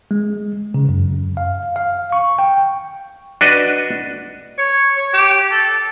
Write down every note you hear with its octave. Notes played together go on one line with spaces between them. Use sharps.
G#3
C#3
F#2
F5
F5
C#6
G5
D4 F#4 B4 D#5
C#5
C#5
G4
A4